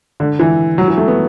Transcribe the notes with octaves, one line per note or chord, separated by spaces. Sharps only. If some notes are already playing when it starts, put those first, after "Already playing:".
D3
E3
F#3
E3
A3
B3